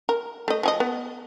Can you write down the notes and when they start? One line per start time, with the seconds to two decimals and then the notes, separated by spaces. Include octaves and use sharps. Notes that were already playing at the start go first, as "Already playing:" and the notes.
0.09 A#4
0.48 A3 D#5
0.63 F3 G#4 D#5
0.80 B3